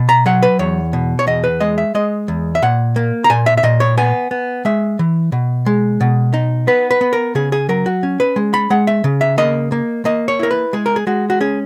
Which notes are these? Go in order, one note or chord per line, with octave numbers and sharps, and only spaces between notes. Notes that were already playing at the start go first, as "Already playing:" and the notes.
Already playing: B2
A#5
F#3 F#5
B4
E2 C#5
B2
C#5
E2 D#5
B4
G#3 D#5
E5
G#3 D#5
E2
E5
A#2 F#5
A#3
A#5
A#2 G#5
E5
E5
A#2 D#5
C#5
B3 G#5
B3
G#3 E5
E3
B2
G#3
B2
D#4
B3 B4
B4
B3
A#4
C#3 G#4
G#4
F#3 A#4
F#4
C#4
B4
G#3
B5
G#3 F#5
E5
C#3
E5
A#3 D#5
A#3
A#3 D#5
C#5
E4 A#4
B4
G#3 G#4
A#4
G#4
G#3 F#4
F#4
C#4 G#4